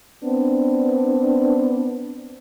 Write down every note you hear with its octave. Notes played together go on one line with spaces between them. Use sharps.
B3 C4 D4